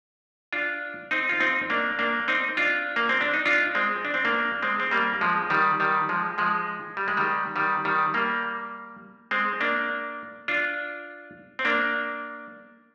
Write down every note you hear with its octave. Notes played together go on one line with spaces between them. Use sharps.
D4 F4
C4 D#4
F4
C4 D#4
A#3 D4
A#3 D4
C4 D#4
D4 F4
A#3
C4
D4
D#4
D4 F4
G#3 C4
D4
C4
A#3 D4
G#3 C4
C4
G3 A#3
F3 G#3
D#3 G3
D#3 G3
F3 G#3
F3 G#3
G3
G#3
D#3 G3
D#3 G3
D#3 G3
G3 A#3
G#3 C4
A#3 D4
D4 F4
C4
A#3 D4